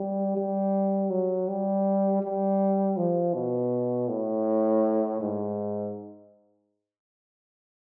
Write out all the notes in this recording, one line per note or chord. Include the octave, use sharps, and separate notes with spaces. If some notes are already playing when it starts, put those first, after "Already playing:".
Already playing: G3
G3
F#3
G3
G3
F3
B2
A2
G#2